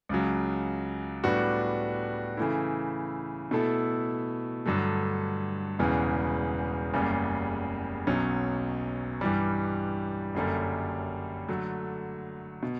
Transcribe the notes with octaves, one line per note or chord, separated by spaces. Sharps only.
C#2 C#3 F#3
A2 G3 B3 D4 F#4
C#3 E3 A3 E4
B2 A3 E4 A4
G2 D3 F#3 A3
E1 E2 C#3 E3 B3
F#1 E2 C#3 G3
B1 B2 F#3 C#4
G2 E3 G3
F#1 F#2 D3 G3
D3 F#3 A3
B2